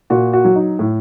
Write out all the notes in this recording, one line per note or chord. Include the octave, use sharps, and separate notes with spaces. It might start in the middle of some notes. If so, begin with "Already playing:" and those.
A#2 F#4
F#4
F#3
D#4
A2